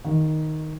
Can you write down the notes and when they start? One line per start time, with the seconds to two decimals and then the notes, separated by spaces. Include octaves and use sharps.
0.05 D#3